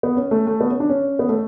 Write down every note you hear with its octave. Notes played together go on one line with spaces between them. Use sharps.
B3
C#4
A3
A3
B3
C#4
D4
C#4
B3
A3